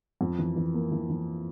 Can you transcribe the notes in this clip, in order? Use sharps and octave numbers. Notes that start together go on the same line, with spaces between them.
F2
E3
E3
A#3
E3
E3